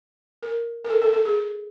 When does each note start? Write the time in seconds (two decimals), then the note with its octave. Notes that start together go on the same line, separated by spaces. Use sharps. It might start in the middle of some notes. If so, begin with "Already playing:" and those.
0.43 A#4
0.85 A#4
0.90 A4
1.02 A4
1.13 A4
1.25 G#4